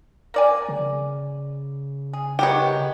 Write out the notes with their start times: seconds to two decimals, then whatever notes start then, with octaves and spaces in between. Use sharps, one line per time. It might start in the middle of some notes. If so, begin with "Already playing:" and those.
0.34 A#3 D5 G#5
0.69 C#3
2.13 G#4
2.39 C3 D#3 B3 G4 C#5